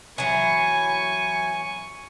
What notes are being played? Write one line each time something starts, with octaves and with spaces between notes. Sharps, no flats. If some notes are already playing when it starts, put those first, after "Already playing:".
E3 F#3 G#5 C#6